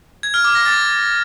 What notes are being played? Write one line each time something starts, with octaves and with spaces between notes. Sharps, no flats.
G#6
F6
D6
A#6
A6